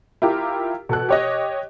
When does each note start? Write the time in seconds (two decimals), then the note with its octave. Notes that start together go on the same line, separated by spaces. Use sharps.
0.22 E4 F4 G4 A#4
0.89 B2 A4 F#6
1.09 G4 C#5 D#5